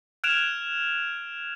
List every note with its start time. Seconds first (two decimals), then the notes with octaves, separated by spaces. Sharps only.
0.24 F6 F#6 G#6 D7 E7 F7